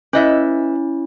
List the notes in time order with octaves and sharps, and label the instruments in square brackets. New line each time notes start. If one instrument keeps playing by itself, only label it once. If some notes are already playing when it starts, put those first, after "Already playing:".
[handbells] C#4 E4 [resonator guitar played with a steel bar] B4 D#5 E5